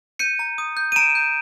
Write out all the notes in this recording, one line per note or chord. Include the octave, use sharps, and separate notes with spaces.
G6 C#7 D#7
A#5
D#6
G6
D#7
A#5 D7 E7
G6